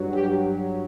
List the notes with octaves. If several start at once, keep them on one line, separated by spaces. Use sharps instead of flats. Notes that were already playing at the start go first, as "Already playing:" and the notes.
Already playing: G2 F#3
G4